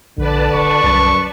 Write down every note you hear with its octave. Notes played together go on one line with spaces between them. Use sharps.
A#1 D3 B4 D5 A5
D#1 C#6
C2 F#2